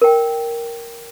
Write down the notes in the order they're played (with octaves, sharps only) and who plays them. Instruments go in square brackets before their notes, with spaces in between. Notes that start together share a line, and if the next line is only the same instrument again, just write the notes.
[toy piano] A#4 G5